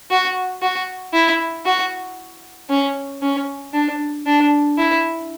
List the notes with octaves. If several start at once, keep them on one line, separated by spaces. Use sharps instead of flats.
F#4
F#4
E4
F#4
C#4
C#4
D4
D4
E4